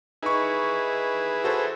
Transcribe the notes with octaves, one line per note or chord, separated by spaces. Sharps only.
D#4 E4 G#4 B4 C#6
F#4 A4 C5